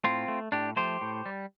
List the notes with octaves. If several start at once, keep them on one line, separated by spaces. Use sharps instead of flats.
A2 C4 F4
A3
A2 D4 G4
F3 A3 G4 C5
A2
G3